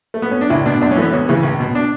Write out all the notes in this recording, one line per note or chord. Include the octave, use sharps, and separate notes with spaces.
A3
B3
C#4
D4
C#2 E4
B2 D4
F#2 D4
C#4
E3 A3
B3
D2 C#4
C#3 E3
C#2
B2
D4